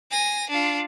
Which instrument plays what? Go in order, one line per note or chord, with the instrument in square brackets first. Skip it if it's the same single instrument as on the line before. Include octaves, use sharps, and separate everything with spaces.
[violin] G#5 A#6
D4 F4